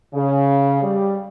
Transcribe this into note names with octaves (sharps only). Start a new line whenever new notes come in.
C#3
G3